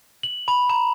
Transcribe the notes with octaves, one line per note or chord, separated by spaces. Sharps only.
F#7
B5
A#5